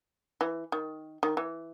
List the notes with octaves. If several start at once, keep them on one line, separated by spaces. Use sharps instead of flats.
E3
D#3
D#3
E3